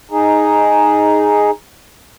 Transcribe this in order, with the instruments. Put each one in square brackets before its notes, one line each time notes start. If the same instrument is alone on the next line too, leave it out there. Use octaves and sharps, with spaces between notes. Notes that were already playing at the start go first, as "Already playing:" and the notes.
[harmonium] D#4 G#4